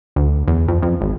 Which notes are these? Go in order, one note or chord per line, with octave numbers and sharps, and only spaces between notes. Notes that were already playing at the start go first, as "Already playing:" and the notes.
D2
E2
F2
F2
G#1